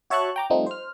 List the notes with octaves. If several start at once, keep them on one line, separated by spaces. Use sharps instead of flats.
F#4 C#5 E5 A5 C#6 F#6
G5 A#5 D6
F3 G3 A3 C4 D#4 F4
C5 F6